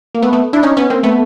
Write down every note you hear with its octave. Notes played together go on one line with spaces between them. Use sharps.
A#3
A3 B3
A3 B3
D4 E4
C#4 D#4
B3 C#4
A#3 C4
A3 B3